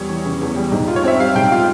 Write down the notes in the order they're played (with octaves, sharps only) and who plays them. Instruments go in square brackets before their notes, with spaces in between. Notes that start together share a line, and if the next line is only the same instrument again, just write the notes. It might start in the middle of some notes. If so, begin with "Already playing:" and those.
Already playing: [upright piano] E2 G3 [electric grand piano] C#5
[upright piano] E3
C#3
E2
G3
G#2
F4
[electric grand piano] C#5
[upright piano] C4 [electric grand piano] E5
[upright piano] G3 [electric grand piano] F5
[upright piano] G#2 [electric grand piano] G5
[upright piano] F4 [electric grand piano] F5